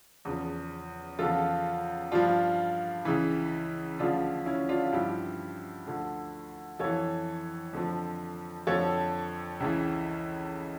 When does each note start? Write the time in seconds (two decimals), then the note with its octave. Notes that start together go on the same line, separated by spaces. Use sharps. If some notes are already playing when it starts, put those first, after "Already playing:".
0.25 E2 C#3 F3
1.19 E2 C#3 F3 F4 A4
2.12 G2 F3 D4 F4
3.05 C#2 C#3 E3
3.99 D2 C#3 F3 D4 F4
4.46 C#4 E4
4.69 D4 F4
4.92 G2 F3 E4 G4
5.87 D2 D3 F3
6.79 F2 E3 A4 C#5
7.73 F2 D3 F3
8.67 F2 D3 F3 A4 C#5
9.60 C#2 C#3 E3